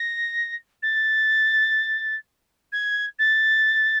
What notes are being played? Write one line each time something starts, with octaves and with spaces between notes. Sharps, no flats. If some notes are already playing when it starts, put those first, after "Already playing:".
Already playing: A#6
A6
G#6
A6